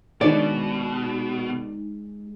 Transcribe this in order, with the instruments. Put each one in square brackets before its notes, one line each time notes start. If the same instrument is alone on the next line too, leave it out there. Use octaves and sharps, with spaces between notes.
[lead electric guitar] B2 [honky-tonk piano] D#3 D4 [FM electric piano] G#3 D#4 G#4 [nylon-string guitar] D5